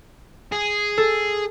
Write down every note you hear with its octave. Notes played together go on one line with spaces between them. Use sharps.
G#4
A4